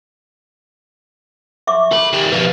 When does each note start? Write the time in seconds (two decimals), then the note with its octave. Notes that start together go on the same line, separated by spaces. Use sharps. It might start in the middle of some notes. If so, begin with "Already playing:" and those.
1.67 E5 C#6 D6
1.91 A4 B5
2.13 D#3 G3
2.32 B2 F3 B4